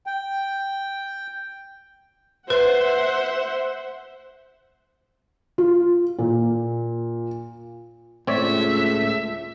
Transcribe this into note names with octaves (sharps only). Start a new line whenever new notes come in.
G5
B4 C5 E5 F#5
F4
A#2
C#2 A2 A3 C4 C#5 D5 E5